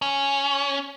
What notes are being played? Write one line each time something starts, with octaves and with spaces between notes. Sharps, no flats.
C#4